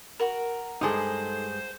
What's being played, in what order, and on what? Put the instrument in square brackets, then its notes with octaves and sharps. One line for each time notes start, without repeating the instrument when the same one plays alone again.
[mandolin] F#4 A#4
[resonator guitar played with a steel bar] G2 G#3 G#4 [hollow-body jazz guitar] D#4 A4 [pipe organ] C5